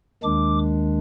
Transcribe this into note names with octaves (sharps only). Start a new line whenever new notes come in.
D#2 D#3 G#3 D4 D6